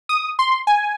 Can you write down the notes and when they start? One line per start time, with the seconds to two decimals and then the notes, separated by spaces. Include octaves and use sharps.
0.09 D#6
0.39 C6
0.67 G#5